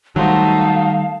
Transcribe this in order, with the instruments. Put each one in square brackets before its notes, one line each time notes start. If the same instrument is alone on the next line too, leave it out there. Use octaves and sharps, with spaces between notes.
[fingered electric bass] D#3 G3 [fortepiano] F#3 C5 [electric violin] A3 D#4 [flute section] F5 A5